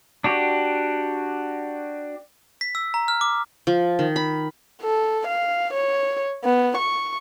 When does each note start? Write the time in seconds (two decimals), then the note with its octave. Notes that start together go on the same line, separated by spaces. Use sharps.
0.24 D4 F#4 G4
2.61 B6
2.75 E6
2.94 A#5
3.08 F6
3.21 D6
3.67 F3
3.99 D#3
4.16 B5
4.81 A4
5.27 F5
5.73 C#5
6.44 B3
6.77 C#6